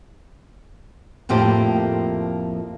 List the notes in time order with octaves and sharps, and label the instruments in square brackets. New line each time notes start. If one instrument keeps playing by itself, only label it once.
[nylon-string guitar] F2 A2 F3 A#3 G4 C5